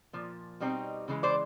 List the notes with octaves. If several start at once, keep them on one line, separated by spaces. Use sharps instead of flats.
A#2 F3
B2 G3 C4 D#4
C#3 E3 G#3
C5 D5